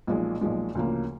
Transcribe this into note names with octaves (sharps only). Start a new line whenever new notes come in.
B1 A#2 F3 G#3
B1 A#2 F3 G#3
D2 C#3 F3 A#3